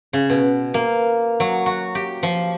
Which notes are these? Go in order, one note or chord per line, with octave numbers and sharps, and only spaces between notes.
C#3
B2
A#3
F#3
F#4
G4
F3